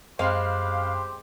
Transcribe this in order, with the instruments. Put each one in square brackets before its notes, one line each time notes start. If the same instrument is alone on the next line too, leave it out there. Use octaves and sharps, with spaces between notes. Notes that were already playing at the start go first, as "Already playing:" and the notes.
[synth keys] F#2 B5 F#6 [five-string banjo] G#3 C4 [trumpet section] G4 C5 [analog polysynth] F5